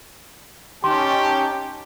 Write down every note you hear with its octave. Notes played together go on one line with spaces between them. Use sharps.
C#4 D#4 G4 A5 C6